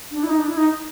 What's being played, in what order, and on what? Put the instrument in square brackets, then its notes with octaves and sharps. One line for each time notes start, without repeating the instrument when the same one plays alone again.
[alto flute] D4
E4
D#4
D4
E4
D#4